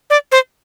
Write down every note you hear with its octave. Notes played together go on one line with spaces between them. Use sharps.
D5
C5